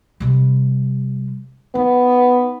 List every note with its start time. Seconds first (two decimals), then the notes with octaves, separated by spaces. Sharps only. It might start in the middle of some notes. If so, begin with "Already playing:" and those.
0.20 C3 G3
1.75 B3 D#4